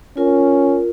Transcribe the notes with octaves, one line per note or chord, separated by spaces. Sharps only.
C#4 F4 A#4